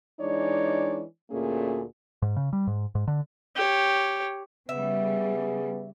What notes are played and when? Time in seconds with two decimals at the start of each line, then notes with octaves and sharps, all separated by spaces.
0.19 E3 G#3 D4 D#4 C#5 D5
1.30 D2 A#2 A3 A#3 C#4 G#4
2.22 G#2
2.36 C#3
2.53 G3
2.67 G#2
2.95 G#2
3.08 D3
3.56 G4 C#5
4.69 C#3 G3 B3 E5
5.04 G#4